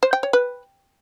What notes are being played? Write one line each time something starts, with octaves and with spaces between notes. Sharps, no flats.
C5
G5
C#5
B4